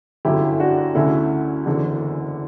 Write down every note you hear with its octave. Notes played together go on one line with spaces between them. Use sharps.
G1 F#2 D3 E4 G4
D4 F#4
D2 D3 C#4 E4
F#1 E2 D3